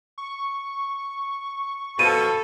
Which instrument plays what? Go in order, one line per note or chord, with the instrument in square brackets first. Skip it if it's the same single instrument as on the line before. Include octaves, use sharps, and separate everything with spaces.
[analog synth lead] C#6
[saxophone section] B2 F3 [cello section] A4 [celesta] D#7